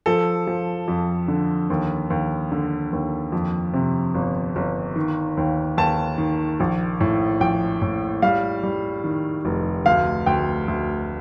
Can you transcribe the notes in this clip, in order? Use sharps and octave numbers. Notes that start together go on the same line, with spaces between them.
F3 A4
F3
F2
D3
D#2
D#2
D3
D#2
F2
C3
G1
G1
D#3
D#2
D#2 A5
D#3
A#1
A2
A#1 G5
A2
G3 F5
G3
D#3
F1
D2 F5
D2 G5
D2